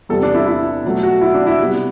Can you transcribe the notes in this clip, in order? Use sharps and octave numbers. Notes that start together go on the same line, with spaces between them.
E2 C3 G3 A4
D4
E4
E4
B2 F#3 A3
F#4
E4
D4
E4
C3 G3 B3